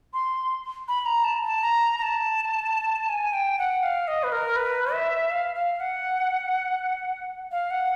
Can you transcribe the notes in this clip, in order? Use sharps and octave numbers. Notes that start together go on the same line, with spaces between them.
C6
B5
A#5
A5
A5
A#5
A#5
A5
G#5
G5
F#5
F5
D#5
B4
A#4
B4
E5
F5
F5
F#5
F5
F#5